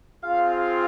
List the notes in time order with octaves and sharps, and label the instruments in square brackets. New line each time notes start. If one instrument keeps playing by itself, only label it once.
[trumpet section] C4 F4 G#4 [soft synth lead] F5